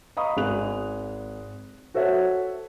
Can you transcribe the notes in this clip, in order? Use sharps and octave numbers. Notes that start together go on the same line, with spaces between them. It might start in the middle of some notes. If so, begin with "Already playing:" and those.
D#5 F5 A#5 B5 C#6 D#6
G#1 G#4 F#6 F7
F#4 A4 C5 C#5 E5 F#5